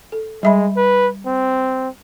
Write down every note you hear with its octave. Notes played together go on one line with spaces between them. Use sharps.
A4
G3 G#3 E5 B5
B4
C4